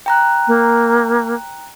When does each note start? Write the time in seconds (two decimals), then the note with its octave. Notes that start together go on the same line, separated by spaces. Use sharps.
0.06 G5 A#5 F#6
0.47 A#3